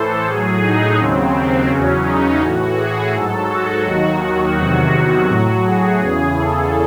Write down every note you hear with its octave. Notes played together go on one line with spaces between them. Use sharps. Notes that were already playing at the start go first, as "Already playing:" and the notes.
Already playing: A2 E3 A4 C5
A2 F#3 G#4
D#4
D#2 C#3 F#3 C4
E2 C#3 F#3 C#4
D#4
A2 E3 F#4
G#4
G#2 F#3 A4
F#4
D#2 D#3 F#3
F#4
E2 C3 D#3 F#3 F#4
F#4
A2 F#3 F#4
G#4
E2 C#3 E3
A4